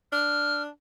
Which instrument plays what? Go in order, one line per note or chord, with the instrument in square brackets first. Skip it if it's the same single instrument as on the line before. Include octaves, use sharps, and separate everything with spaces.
[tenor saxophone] D4 [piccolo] F6